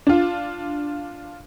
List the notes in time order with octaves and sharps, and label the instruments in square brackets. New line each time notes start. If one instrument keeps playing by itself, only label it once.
[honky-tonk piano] D4 F4